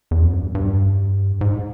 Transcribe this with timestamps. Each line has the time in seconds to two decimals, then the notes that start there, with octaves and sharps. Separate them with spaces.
0.11 E2
0.22 F2
0.33 F#2
0.44 G2
0.55 G2
1.41 G#2